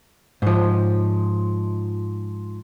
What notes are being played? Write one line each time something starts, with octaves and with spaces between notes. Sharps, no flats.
G#2 F3